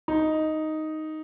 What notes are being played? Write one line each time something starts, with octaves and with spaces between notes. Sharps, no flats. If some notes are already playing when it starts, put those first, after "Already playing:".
D#4